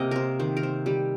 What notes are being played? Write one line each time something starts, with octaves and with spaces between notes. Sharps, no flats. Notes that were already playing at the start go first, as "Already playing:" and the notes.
Already playing: C3 A#3 D#5
A#4 C5
D#3 C5
A#4
C5
G3 G4